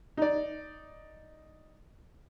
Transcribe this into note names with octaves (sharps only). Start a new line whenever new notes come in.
D#4 D5